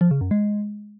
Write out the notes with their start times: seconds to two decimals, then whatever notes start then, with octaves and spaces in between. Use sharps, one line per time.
0.01 F3
0.11 C#3
0.21 F#2
0.31 G#3